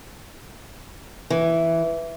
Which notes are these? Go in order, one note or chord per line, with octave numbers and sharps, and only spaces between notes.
E3